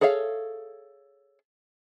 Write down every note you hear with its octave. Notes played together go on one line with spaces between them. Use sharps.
G#4 A4 C#5 E5 F5